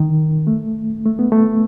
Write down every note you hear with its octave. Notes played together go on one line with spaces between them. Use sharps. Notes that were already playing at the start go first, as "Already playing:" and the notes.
Already playing: D#3
A3
A3
B3
A3